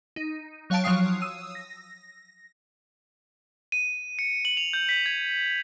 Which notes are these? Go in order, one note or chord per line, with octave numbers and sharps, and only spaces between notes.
D#4
F#3 C#5 F5 G5 A5 D7
F3 F#3 C#5 F5 D#6 C7
D#6 E6 D#7
A#6
D#7
C#7
F#7
F7
G6
B6
G#6